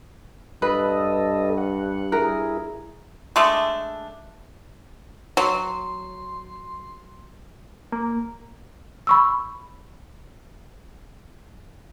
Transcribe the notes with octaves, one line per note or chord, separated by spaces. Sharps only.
G2 A4 B4 D#5
F#5
E4 G#4 A#4
G#3 A3 D4
F#3 C6
A#3
B5 C#6 E6